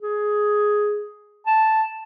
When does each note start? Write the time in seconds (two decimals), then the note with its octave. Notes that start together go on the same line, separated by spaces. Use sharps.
0.02 G#4
1.46 A5